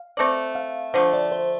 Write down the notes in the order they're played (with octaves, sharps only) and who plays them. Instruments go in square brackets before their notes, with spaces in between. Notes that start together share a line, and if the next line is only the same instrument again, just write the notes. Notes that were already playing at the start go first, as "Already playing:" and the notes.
Already playing: [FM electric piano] F5
[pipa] A3 C4 A4 D5
[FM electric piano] F5
[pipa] D3 F3 A3 [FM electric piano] C5
[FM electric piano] D5
C5